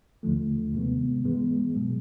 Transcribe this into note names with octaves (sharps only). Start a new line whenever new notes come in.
D#2 D3 F3 A3
C3 D#3 G#3 B3
G2 E3 G#3 B3
B2 F#3